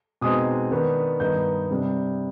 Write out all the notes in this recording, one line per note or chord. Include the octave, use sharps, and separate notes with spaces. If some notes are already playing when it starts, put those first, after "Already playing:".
B2 G#3 C4 D#4 D#6
D#3 B3 D4
G2 D#3 B3 D#4 G6
C3 G3 D4